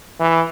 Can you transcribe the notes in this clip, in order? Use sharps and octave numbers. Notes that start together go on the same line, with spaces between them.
E3